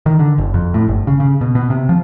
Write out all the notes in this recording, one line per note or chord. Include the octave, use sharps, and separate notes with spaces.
D#3
D3
F#1
F2
A2
G1
C#3
C#3
B2
B2
C3
F3